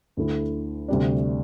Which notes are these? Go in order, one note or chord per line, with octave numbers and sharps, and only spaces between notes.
D2 D3 A3 E4
D2 C3 G3 D4